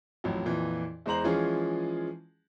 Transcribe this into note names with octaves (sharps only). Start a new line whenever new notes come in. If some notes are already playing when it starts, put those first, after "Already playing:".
A1 F2 F#3
F2 A#2 E3
E2 G#3 C5 A#5 F#7
E3 F3 G#3 C#4 F4 G#4